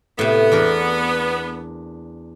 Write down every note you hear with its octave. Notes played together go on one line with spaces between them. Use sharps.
A2 C3 B3
E2 D4 A#4